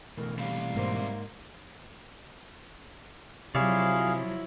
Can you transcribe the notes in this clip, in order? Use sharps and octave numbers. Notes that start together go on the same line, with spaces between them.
B2 E3 A3 A#4
C3 G3 F5
G#2 A#3 C5
C3 F3 F#3 E4 G#4 C#5 D5 F5